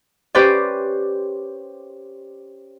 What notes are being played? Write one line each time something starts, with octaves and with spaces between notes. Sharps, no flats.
C#4 G4 B4 C5 D5